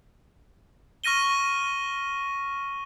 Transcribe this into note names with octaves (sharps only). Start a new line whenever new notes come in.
C#6 F6 A#6 D#7 G7